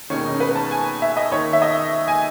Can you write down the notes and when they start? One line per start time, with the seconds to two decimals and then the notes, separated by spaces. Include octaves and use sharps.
0.10 E1 D#2 D#3 C#4
0.25 D#4
0.40 B4
0.56 A5
0.71 G#5
1.02 E5
1.17 D#5
1.32 D#2 D#3 C#5
1.53 E5
1.62 D#5
2.08 G#5